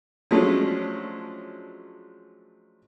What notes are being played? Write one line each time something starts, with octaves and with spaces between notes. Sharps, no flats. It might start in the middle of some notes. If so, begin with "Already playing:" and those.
F3 F#3 G#3 A3 C#4 D4